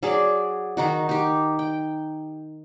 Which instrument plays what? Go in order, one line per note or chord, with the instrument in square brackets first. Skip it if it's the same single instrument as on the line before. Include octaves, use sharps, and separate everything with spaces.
[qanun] F#3 G#4 D5
D#3 D#4 F#4
D#4 G4
G5